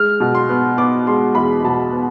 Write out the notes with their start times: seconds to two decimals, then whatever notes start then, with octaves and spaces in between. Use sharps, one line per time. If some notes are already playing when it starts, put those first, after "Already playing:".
Already playing: G#3 F6
0.20 B2
0.35 C6
0.49 B3
0.78 B3 D6
1.07 G#3 C6
1.35 E2 B5
1.64 B2 A5
1.93 B3